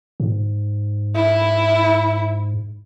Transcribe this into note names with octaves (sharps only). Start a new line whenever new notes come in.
G#2
E4